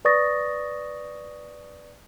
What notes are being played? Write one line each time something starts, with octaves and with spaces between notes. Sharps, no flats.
B4 D5 C#6 D#6 A6 A#6